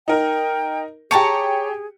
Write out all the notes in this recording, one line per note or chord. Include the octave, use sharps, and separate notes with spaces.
D#4 A#4 G5
G4 G#4 C#5 A5 A#5 C#7